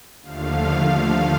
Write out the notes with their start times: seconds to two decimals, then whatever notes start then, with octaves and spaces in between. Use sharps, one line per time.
0.22 D#2 D3 F3 A3 F5